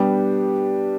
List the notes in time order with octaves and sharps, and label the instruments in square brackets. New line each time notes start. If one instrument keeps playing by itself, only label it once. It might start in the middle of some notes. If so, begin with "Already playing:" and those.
Already playing: [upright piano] G3 B3 D4 G4